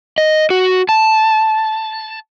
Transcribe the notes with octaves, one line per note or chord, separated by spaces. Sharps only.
D#5
F#4
A5